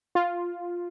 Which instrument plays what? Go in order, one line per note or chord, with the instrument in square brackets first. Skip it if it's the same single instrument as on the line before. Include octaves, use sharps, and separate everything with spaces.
[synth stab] F4